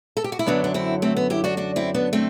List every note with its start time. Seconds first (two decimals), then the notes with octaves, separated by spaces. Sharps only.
0.17 A4
0.24 G4
0.32 F#4
0.39 E4
0.46 F#2 D3 F#3 B3 D4
0.64 D4
0.74 C4 E4
1.02 A3 C4
1.17 B3
1.30 E4 G4
1.44 D4 F#4
1.57 D4 F#4
1.76 C4 E4
1.94 B3 D4
2.13 A3 C4